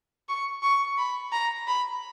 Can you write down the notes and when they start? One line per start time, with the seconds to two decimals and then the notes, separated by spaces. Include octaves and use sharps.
0.29 C#6
0.63 C#6
0.98 B5
1.32 A#5
1.67 B5